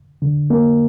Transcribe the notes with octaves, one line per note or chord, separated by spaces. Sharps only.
D3
A#3